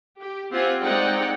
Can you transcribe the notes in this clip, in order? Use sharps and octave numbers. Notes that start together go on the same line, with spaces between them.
G4
C4 F4 G4 F#5 G#5
G#3 C4 D#4 D5 F#5 G5